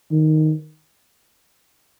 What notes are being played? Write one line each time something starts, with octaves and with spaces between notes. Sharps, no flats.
D#3